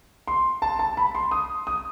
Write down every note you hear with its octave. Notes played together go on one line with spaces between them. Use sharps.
C6
A5
A5
B5
C6
D#6
D#6